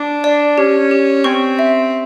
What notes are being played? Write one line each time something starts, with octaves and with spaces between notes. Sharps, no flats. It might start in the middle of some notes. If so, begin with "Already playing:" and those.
Already playing: D4
D5
C#4 G4
G4
C4 C#6
E5